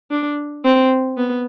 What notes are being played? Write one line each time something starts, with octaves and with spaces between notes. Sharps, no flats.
D4
C4
B3